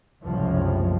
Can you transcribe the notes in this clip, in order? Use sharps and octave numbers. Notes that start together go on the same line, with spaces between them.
F#1 C2 F#2 A2 F3 G#3